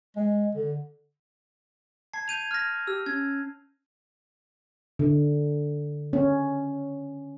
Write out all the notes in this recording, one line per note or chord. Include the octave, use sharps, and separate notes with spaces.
G#3
D3
A5 G#6 C7
G6 D#7 F7
F6 A#6
G4 E6
C#4 G#6
D3
C#4